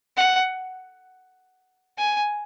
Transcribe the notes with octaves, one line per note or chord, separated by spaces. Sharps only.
F#5
G#5